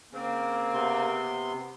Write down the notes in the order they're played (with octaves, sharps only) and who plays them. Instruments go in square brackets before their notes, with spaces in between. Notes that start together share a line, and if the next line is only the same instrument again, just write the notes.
[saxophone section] C#3 C4 [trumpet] A#3
[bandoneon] C3 B3 C6